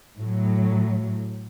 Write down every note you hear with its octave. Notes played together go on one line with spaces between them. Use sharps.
A2 F#3